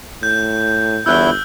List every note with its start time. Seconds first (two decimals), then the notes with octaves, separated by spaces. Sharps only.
0.23 A2 G6
1.06 G1 E2 E4 E6 F#6 G6 G7